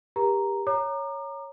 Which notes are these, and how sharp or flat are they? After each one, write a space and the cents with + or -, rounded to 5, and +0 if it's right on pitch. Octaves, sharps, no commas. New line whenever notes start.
G4 +20 A#4 +40 A#5 +0
C#5 +0 A#5 +0 D6 +40